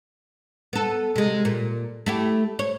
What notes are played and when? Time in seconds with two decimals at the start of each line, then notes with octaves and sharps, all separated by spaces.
0.73 B3 A4
1.16 C3 G#3
1.45 A#2
2.06 A3 E4 G4
2.59 C#5